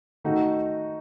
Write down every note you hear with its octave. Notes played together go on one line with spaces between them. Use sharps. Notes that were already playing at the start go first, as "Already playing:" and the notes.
D#3 A3 D#4 F#4